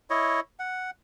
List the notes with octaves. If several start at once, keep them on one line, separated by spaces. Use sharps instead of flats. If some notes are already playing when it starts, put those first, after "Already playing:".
E4 C#5 D#5
F#5